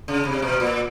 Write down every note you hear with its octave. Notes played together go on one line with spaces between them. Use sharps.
C#3
C3
B2
A#2